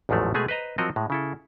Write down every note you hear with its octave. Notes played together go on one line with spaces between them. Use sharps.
A1 E2 G#2 F3 F#3 A3
B2 G#3 A3 G#4 B4 G#5
B4 C5 D#5 A#5
F3 F#3 C4 F#4 A#4 D#5
A2 G#3
C#3 E4 A4